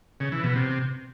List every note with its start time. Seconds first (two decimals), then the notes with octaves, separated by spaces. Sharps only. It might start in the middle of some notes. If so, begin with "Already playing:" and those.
0.20 C#3
0.32 E3
0.44 B2
0.55 C3